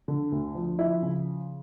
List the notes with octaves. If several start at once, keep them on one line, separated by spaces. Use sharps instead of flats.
D3
D2
F3
F3 E4
C#3